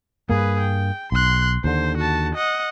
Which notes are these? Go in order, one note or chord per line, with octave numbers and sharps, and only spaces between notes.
G2 A#3 G#4 B4
G5
B1 C6 F#6
D#2 D3 C5
F#4 A5
D#5 F#5